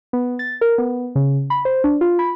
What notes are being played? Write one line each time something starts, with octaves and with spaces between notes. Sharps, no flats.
B3
A6
A#4
B3
C#3
B5
C5
D4
F4
B5